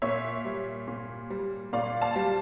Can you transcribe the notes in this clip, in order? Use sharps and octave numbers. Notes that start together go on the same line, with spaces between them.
A#2 C#5 E5
G3
A#2
G3
A#2 D5 F5
F5 A5
G3